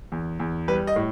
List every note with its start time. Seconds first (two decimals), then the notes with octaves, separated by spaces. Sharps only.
0.12 E2
0.40 E2
0.68 G3 B4
0.87 D#5
0.96 A2